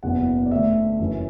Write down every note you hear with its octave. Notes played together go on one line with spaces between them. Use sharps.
F#1 E2 B2 F#5
D5
D2 D3 A3 D4 E5
F#1 F#2 E3